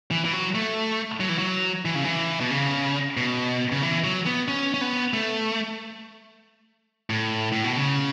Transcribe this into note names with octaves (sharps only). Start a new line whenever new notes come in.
E3
E3
F#3
A3
F#3
E3
F#3
E3
C#3
E3
B2
C#3
B2
C#3
E3
F#3
B3
C#4
C#4
B3
A3
A2
A2
B2
C#3